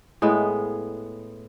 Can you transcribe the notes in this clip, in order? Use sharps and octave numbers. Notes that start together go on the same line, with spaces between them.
A2 G#3 B3